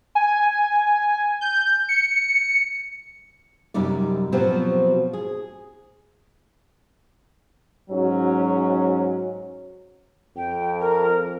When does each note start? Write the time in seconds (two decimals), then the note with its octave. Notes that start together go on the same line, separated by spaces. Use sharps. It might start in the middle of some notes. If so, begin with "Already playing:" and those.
0.15 G#5
1.41 G6
1.89 C#7
3.74 F#2 C3 G3 D#4 D5
4.32 B2 F3 F#3 C4 F#4 G4
5.13 G#4
7.90 G#2 F#3 C#4 F#4 C#5
10.36 F2 G5
10.80 A#4